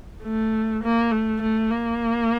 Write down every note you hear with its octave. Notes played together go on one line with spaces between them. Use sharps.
A3
A#3
A3
A3
A#3